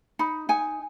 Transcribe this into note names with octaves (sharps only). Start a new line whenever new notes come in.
D#4 B5
D#4 G#5